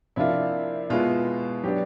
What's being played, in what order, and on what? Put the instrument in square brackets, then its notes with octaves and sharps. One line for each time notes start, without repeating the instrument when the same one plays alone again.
[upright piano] C3 F3 A#3 D4 F4 [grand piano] E4
[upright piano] B2 G#3 B3 E4 [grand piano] F4
[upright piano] F#3 B3 D4 [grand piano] G4